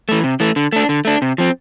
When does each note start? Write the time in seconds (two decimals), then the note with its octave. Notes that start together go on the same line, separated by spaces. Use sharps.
0.09 E3 A3
0.24 C3
0.40 E3 A3
0.56 D3
0.72 A3 D4
0.89 D3
1.05 A3 D4
1.22 C3
1.38 F3 C4